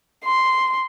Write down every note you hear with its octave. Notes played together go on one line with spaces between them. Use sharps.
C6